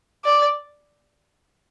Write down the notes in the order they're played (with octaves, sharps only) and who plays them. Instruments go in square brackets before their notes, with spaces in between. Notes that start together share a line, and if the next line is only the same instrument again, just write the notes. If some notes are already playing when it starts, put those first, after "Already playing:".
[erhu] D5